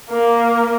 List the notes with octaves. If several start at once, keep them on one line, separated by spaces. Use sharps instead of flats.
A#3